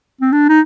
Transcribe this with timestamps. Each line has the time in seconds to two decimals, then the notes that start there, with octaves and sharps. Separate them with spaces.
0.21 C4
0.33 D4
0.49 D#4